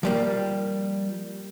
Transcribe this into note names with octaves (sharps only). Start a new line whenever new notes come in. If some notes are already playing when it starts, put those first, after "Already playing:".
F3 G3 A#3